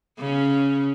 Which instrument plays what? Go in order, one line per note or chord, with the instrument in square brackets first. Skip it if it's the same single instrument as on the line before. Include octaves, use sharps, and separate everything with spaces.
[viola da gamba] C#3 C#4